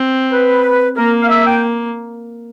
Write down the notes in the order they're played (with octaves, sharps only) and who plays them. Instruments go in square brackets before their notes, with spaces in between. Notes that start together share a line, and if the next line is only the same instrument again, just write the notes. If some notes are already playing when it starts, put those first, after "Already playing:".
Already playing: [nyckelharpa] C4
[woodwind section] B4
[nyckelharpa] A#3 [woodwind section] A#4
[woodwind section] F5
E5
G5